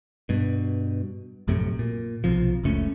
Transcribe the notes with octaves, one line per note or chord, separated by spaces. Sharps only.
G2 B2
A#1 F#2 A2 C3
A#2
B1 C3 F3
F#1 C#2 A3 C#4